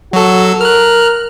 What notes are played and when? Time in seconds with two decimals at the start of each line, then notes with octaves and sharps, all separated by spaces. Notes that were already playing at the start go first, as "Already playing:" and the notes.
0.13 F#3 F#4 A4
0.61 A#4 F6 F#6